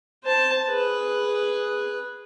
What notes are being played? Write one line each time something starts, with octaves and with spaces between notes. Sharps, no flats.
C5 A5
G#4 B4